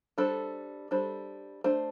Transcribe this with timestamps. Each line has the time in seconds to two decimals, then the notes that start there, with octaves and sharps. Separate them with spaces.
0.18 G3 D4 A4 C5
0.91 G3 D4 A4 C5
1.64 A3 D4 C5